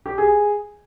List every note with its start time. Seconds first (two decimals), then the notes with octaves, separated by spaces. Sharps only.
0.06 G4
0.18 G#4